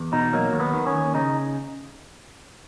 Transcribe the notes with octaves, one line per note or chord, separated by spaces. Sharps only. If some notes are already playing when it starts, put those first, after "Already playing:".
Already playing: E2
B2 D#4
F#3 A#3
D#2
B3
D#3
C#4
D#2
C#3 D#4